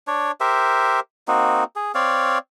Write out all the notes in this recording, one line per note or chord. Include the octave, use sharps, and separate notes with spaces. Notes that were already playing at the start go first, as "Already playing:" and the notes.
D4 C#5
G4 A#4 C5 E5
A#3 C4 D#4 F#4
G#4
C4 C#5 D5 F5